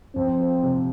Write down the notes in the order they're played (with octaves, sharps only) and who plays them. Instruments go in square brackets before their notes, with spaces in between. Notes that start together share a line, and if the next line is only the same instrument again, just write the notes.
[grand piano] F2 [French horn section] C4
[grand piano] F3
C3